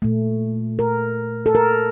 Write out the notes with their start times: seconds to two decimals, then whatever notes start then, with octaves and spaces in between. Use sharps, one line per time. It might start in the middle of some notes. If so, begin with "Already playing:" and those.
0.02 A#2 A3
0.79 A#4
1.46 A4
1.55 A#4